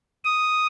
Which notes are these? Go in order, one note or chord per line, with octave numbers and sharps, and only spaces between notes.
D#6